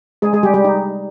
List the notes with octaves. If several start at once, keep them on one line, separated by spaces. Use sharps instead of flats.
G#3 G#4
G#3 G#4
G3 G4
G3 G4
D#4